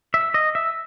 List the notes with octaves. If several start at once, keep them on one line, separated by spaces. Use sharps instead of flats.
E5
D#5
E5